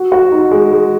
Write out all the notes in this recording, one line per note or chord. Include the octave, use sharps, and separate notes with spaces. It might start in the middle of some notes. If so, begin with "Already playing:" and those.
Already playing: F#4
F#4
D#4
G#3
G#3